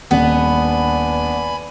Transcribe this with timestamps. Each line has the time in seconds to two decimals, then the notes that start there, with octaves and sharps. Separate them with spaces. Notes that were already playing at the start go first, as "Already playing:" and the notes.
0.11 D#1 B3 D4 G#5 B5